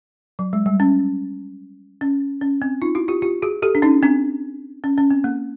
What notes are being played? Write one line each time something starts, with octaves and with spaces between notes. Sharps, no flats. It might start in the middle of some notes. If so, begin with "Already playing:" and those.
F#3
G#3
G3
C#4
C#4
C#4
C4
D#4 F4
E4 F#4
F4 G4
F4 G4
F#4 G#4
G4 A4
D4
C#4 D#4
C4 D4
C#4
C#4
C4
A#3